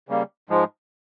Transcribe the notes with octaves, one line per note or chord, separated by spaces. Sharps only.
C#3 G3 A#3
G#2 F3 G#3